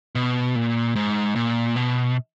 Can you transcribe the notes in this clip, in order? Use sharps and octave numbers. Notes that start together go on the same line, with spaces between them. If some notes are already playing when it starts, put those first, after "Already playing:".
B2
A#2
G#2
A#2
B2